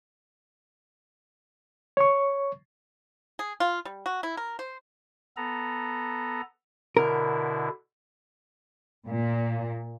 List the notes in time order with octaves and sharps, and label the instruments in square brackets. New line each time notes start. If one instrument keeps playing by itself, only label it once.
[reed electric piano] C#5 C#6
[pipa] G#4
F4
G3
F#4
E4
A#4
C5
[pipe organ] B3 A4 A#5
[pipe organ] B2 D3 E4 [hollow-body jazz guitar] A#4
[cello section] A#2